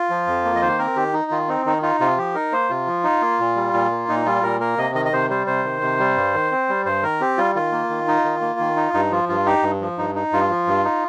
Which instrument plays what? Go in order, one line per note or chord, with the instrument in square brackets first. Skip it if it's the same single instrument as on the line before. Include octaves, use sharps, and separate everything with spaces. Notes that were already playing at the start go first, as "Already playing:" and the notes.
Already playing: [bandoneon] F4
F3
F2
A#3
D#5
D#3 C5
C4 A#4
D#3 G4
D#4
D#3 F4
C4 D#4
D#3 D#4
D#4 F4
C3 F4
F3 G4
D#4 A#4
A#3 C5
C3 F4
F3
D#4
A#3
A#2
G3
A#2
A#3
A#2 D#4
G3 F4
A#2 A#4
A#3 A#4
C3 D#5
D#3 D#5
D#5
C3 C5
G3 C5
C3 C5
D#3
C3
G3
G2
D#3
C4
G3
G2 C5
D#3 A#4
C4 G4
G3 F4
D#3 F4
A#3
D#3
D#4
D#3
A#3
D#3
D#4
G2 D#4
F3 F4
G2 F4
D#4 G4
G2
F3
G2 D#4
D#4
G2 F4
F3
G2
D#4